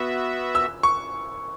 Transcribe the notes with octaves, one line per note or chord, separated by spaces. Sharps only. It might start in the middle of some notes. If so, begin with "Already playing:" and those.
Already playing: B3 F#4 E5
E6
C#6